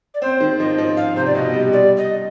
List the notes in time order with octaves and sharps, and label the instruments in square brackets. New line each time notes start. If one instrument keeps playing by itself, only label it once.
[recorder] D5
[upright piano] C4 [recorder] C5
[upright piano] D#3
[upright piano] F3 [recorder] D#5
[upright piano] F3
[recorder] F5
[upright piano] C3 [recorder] C5
[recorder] D5
[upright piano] B2 [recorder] D#5
[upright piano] G3
[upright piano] G3 [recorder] D5
[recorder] D#5